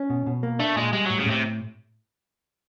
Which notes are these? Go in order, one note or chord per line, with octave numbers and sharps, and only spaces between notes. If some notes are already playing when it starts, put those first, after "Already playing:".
Already playing: C#4
B2
B2
A#3
A3 D4
A#2 G#3
G3 G#3
A2 F#3
C#3
A2 C3